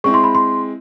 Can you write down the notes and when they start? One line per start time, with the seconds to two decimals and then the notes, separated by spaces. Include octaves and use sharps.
0.04 G#3 C4 E4 C#6
0.14 C6
0.24 B5
0.35 C6